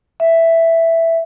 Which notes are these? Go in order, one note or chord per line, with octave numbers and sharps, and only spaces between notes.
E5